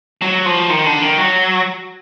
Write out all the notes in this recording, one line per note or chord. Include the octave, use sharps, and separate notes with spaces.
F#3
F3
D#3
D3
D#3
F#3